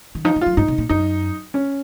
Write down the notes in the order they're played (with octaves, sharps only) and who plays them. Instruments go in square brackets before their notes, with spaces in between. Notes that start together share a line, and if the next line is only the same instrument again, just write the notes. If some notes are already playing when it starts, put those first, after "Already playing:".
[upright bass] D#3
[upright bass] F3 [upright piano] D#4
[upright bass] D#3
[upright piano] F4
[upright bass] F#3
[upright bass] G#2 [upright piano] D#4
[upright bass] C3
A#2
[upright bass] F#2 [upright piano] D#4
[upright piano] C#4